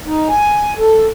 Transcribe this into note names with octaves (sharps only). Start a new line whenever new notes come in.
D#4
G#5
A4